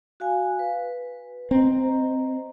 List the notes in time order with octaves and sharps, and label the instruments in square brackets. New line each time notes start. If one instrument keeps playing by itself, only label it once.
[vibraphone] F#4 F5 G#5
B4
[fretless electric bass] C4 [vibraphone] D#5 A#5